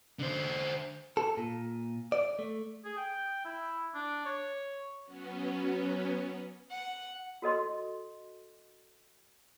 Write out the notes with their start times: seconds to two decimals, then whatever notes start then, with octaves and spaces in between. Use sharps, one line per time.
0.19 D3 C5
1.17 A4
1.37 A#2
2.12 D5
2.39 A3
2.85 G#4
2.97 G5
3.45 E4
3.94 D4
4.26 C#5
5.05 F#3 B3 C#4
6.71 F#5
7.42 F#4 A4 D#5 C6